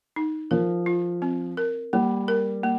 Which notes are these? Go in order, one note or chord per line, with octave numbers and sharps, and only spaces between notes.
D#4
F3 A#4
F4
C4
A#4
G3 A#3
A#4
A#3